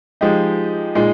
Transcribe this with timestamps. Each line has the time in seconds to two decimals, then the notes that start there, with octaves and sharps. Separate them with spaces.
0.21 F3 G#3 D#4 G4
0.95 A#2 G#3 D#4